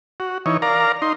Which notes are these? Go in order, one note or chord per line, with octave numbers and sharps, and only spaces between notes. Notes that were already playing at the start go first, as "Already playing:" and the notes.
F#4
E3 D#4 C#5
A#4 D5 F5 A#5
D#4 C6